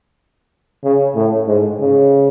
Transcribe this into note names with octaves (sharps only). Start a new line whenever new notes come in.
C#3
A2
G#2
C#3